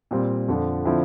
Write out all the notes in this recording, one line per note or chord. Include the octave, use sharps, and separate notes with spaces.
A#2 G3 C4 F4
F2 D3 F3
D3 F3 C4 E4